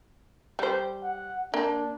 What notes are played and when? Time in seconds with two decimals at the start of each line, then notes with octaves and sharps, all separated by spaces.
0.59 G3 C5
1.03 F#5
1.54 A#3 D4